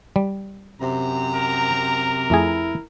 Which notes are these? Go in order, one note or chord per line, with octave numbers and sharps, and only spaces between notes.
G3
F#2 C3 C4 A#5
A#4
F2 A3 E4 G#4